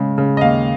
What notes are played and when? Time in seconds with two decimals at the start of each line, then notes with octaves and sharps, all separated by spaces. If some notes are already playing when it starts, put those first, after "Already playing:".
Already playing: C#3 G#3
0.18 C#3
0.37 D#5
0.41 D#2 F5